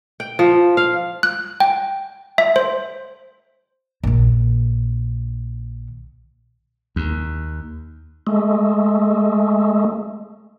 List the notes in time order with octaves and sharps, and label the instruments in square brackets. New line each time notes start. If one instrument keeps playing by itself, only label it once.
[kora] G5
F3
F5
[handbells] F#6
G5
E5
C5
[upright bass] A#1 D3
[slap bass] D#2
[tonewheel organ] G#3 A3